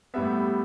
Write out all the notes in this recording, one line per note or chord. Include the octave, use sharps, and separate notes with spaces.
A2 G3 B3 E5